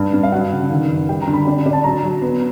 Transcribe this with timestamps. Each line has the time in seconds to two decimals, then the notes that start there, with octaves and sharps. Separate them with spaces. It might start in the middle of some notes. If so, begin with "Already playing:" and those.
Already playing: G2
0.14 G2
0.23 F5
0.32 F#3 F#5
0.52 C#3
0.70 D#3
0.89 F#2
1.09 G3 G5
1.22 A#5
1.28 D3
1.34 B5
1.47 D4
1.66 D4
1.73 A5
1.84 F#3 A#5
2.03 F#3
2.22 B3